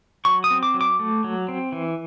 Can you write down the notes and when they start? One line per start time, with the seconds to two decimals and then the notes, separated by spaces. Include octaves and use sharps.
0.25 F#3 C#6
0.44 D#6
0.51 C4
0.63 D6
0.74 F#3
0.81 D6
0.99 A3
1.24 F#3
1.48 C4
1.72 E3